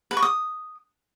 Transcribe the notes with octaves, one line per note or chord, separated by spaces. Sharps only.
B4
C#6
D#6